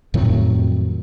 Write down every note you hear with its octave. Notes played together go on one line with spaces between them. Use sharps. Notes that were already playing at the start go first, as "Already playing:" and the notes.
F2 A2 D#3 F#3